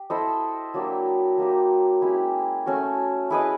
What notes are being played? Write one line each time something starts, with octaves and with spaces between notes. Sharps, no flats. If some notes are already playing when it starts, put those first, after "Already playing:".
Already playing: G4
E4 A4 C5 D#5
F#3 A#3 D4 G4
F#3 A#3 D#4 G4
G#3 C#4 E4 G4
A3 C#4 F#4
E4 G#4 B4 D#5